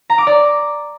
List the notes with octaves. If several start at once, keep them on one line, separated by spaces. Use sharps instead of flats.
A#5
D6
D5